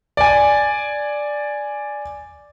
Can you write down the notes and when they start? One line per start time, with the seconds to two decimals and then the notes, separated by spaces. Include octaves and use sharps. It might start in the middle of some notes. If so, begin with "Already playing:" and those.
0.17 D5 G#5